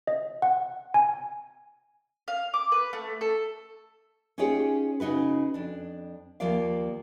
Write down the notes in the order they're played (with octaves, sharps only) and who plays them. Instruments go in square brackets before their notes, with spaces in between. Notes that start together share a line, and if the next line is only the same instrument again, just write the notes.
[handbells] D#5
F#5
G#5
[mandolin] F5
D6
B4
A3
A4
[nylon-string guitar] C#4 D#4 F4 G4 G#4 C#5
C#3 D#4 F#4 B4
F2 D4
D#2 F3 A#3 F4 D5 F5